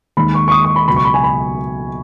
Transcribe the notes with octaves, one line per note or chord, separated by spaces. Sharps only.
D#2 D#3 G#3 B5
C#6
C#6
D#6
C#6
B5
C#2 B2 F#3 B5
C#6
B5
G#5
B5